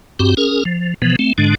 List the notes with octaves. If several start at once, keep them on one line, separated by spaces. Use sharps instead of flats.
G2 C4 F#4 G4
C#4 G#4 A#4
F3
B2 E3 F3 B3
A3 C4
G#2 D3 G#3 D4